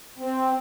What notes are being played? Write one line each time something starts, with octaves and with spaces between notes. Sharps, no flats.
C4